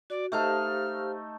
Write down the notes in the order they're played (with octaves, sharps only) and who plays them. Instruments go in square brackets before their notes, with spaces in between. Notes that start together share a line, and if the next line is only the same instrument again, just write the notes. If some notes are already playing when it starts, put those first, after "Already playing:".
[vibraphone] F#4 [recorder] D5
[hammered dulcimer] A3 D#4 A4 [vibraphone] G4 C5 F5 [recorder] F6